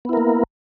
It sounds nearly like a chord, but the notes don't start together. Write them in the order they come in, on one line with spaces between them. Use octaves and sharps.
B3 E4 A#4 A#3